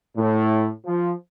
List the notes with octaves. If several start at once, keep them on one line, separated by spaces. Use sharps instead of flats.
A2
F3